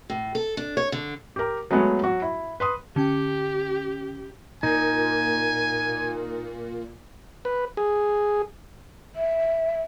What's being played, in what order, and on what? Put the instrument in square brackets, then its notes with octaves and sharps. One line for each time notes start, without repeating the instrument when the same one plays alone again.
[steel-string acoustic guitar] A2
A4
D4
C#5
D3
[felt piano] G4 A#4
F#3 G#3 A3 B3 C#5
F#3 F#4
E4
B4 C6 D#6
[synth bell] D3 C#4 G5 [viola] G4
[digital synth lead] A#2 [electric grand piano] D#4 [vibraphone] A#4 [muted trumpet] G#5
[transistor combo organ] B4
G#4
[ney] E5